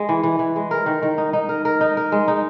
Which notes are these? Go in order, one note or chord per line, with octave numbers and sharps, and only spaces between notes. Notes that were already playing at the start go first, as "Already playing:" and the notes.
Already playing: G#3
E3
E3
E3
G#3
A#4
D#3
D#3
D#4
D#4
A#4
A#4
D#4
A#4
G#3
D#4